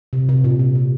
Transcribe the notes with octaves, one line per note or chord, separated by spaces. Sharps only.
C3
C3
A#2
C3
C3